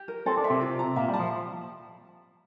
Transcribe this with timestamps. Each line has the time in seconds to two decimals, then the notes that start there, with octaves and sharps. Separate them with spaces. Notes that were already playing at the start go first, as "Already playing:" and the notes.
Already playing: G4
0.08 A#4
0.26 C4 A4
0.37 D4
0.44 E5
0.50 C3 C4
0.61 F4
0.79 A#5
0.96 A#2 A#3 E5
1.08 G3
1.13 A5
1.19 F3